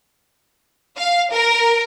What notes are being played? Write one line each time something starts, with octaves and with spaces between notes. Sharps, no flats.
F5
A#4